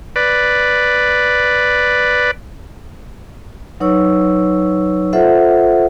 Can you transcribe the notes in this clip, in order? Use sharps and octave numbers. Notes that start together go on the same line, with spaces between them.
B4 D5
F#3 D#4 B4 C#5 C#6 E6
F4 A4 C5 E5 F#5